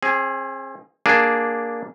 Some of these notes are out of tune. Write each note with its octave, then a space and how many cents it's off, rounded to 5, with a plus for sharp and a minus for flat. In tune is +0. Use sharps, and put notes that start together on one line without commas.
C4 +40 G#4 +0
A#3 +0 D4 +0 G#4 +0